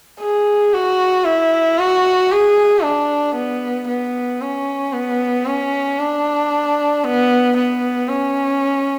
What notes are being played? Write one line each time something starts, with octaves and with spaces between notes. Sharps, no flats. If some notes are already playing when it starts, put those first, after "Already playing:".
G#4
F#4
E4
F#4
G#4
D4
B3
B3
C#4
B3
C#4
D4
B3
B3
C#4